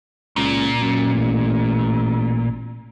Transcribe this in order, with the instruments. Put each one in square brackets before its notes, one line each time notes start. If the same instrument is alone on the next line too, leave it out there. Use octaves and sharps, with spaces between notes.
[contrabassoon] C#2 [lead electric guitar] A#2
[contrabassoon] F#2
A1